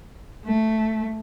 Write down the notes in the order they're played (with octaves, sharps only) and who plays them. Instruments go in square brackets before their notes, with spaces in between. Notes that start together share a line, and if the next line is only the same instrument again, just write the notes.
[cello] A3